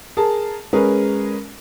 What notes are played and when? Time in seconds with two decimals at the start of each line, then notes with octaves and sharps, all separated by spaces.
0.17 G#4 A#4 A5
0.73 G#3 C#4 G#4 A#4 B4